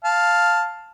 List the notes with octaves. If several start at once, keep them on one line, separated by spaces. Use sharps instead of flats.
F5 A5